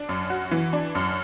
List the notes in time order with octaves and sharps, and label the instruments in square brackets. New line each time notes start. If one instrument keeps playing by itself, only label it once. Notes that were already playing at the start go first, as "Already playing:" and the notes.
Already playing: [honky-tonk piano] D4
F#2
F#4
E3
D4
F#2